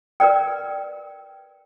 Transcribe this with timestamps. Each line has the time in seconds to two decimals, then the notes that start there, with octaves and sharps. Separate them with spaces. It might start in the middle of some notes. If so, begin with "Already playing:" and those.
0.20 A#4 B4 D5 G5